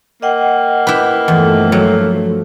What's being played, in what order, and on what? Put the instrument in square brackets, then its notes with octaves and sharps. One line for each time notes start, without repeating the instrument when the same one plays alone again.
[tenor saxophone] A#3 [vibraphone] D#5 F#5 G5
[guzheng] E4 G4 B4
[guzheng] E2 [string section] G2 F3 A3
[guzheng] F#3